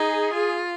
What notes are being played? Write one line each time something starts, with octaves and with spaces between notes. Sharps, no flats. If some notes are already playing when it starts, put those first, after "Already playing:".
Already playing: D#4 G#4
F4